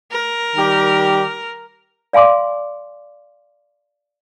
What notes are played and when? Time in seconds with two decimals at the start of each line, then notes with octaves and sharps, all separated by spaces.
0.12 A#4
0.56 D#3 G3 G4
2.13 D5 F5 G#5 C6 D6